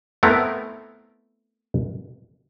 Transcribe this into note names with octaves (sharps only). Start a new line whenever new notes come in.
A3 B3 C4 E4 A#4